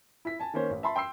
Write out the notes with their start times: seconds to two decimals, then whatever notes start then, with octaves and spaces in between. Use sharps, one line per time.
0.25 E4 B6
0.40 G#5 A5
0.54 D#3 A#3 C#4 C5 C#5
0.70 A1
0.83 E5 A5 B5 C6
0.96 G5 C6 E6 C7